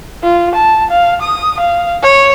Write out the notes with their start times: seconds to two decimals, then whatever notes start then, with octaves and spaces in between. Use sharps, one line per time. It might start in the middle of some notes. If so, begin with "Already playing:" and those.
0.23 F4
0.55 A5
0.90 F5
1.21 D#6
1.59 F5
2.03 C#5